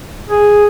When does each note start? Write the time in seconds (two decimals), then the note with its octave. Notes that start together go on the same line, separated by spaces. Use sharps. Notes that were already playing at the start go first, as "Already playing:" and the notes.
0.29 G#4